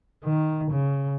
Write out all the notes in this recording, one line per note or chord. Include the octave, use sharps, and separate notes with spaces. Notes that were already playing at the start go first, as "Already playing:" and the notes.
D#3
C#3